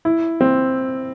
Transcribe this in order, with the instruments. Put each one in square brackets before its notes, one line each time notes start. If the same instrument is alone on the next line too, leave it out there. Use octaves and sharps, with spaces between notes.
[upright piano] E4
C4